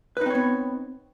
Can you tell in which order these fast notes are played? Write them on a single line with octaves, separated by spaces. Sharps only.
B4 D#4 C4 C#5 B3